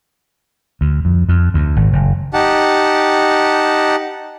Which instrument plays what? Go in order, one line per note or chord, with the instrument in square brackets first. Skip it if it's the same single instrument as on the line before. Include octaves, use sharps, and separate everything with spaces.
[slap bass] D2
F2
F2
D2
G#1
F#1
[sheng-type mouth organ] D#4 G4 F#5 A5